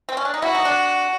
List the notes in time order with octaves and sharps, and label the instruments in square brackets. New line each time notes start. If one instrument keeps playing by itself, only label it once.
[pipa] C4
C#4
D4
D#4
[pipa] E4 [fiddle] F#4
[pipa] D#4
D4